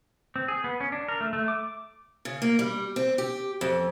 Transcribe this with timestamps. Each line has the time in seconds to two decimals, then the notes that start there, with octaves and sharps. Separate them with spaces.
0.36 C4
0.48 G#4
0.64 B3
0.81 C#4
0.92 D4
1.09 A#4
1.21 A3
1.33 A3
1.48 D6
2.25 C#3
2.42 A#3
2.59 G3
2.96 C4
3.18 G4
3.61 F2